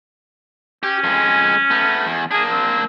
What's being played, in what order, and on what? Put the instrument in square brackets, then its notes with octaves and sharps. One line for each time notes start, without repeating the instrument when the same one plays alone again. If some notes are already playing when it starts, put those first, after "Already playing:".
[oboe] C#4 [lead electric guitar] G4
[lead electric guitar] F2 G#3
A3 B3
E2
[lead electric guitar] A#3 D4 [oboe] G#4
[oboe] C4